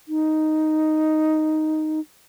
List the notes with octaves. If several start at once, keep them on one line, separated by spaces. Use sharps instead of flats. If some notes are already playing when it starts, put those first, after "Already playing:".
D#4